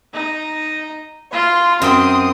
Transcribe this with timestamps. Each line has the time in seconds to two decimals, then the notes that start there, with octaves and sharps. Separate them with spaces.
0.13 D#4
1.33 F4 C6
1.82 F#2 C4 G5 C6 D#6